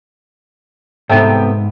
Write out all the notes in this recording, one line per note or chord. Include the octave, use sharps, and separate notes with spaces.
G#2 C3 B3 A4 E5 G5